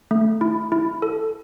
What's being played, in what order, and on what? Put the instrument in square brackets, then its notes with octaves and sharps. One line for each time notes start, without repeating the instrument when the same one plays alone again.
[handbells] A3
E4
E4
A4